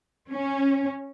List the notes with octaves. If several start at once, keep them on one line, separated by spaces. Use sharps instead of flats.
C#4